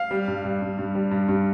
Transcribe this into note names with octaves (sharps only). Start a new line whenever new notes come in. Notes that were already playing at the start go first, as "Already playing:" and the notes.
Already playing: F5
G3
G2
G2
G2
G2
G3
G2
G2